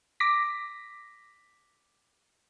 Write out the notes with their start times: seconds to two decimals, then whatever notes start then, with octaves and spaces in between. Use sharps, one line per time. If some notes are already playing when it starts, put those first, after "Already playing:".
0.20 D6 A#6 B6